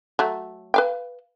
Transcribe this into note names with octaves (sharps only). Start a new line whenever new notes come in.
F#3 A3
B4 F5 G5